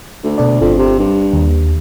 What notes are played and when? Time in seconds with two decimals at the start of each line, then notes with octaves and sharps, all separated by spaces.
0.23 D2
0.38 B2 A4 D5
0.61 G1 F2 D4
0.78 C3
0.99 G2
1.33 D#2